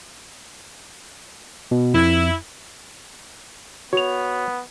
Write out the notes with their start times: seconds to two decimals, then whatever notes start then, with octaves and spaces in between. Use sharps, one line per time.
1.71 B2
1.94 F2 E4
3.93 B3 F#4 C#5 F7